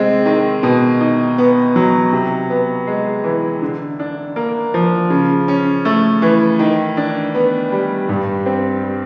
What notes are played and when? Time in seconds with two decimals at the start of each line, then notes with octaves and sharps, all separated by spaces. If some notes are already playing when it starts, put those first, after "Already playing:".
Already playing: C3 G#3 C4
0.26 D#3
0.63 B2
1.00 D#4
1.38 B3
1.76 F#3
2.13 C3
2.50 B3
2.87 G#3
3.24 E3
3.62 D3
3.99 D4
4.36 A#3
4.74 F3
5.10 C#3
5.48 C#4
5.85 A3
6.22 E3
6.59 D#3
6.97 D4
7.35 B3
7.72 G3
8.09 G2
8.46 C4
8.83 G3